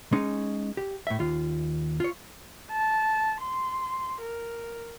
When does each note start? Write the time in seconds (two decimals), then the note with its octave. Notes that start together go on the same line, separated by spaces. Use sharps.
0.12 G#3 C#4 D#4
0.77 G4
1.07 A2 E5
1.19 D#2 F4
2.00 F4 C#5
2.72 A5
3.41 C6
4.21 A#4